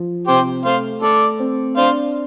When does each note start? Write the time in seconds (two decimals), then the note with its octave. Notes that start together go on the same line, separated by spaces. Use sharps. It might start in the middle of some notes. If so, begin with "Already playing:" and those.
Already playing: F3
0.27 C3 G4 C5
0.65 A3 C5 F5
1.02 A3 A4 D5
1.39 C4
1.77 D4 C5 F5